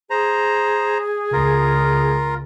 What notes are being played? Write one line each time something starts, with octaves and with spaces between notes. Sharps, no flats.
G#4 C5 A#5
C#2 F4 A#4